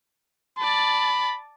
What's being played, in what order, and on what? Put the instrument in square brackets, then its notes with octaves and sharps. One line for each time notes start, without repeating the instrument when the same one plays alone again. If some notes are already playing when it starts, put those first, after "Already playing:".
[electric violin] D5 A5 [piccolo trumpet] B5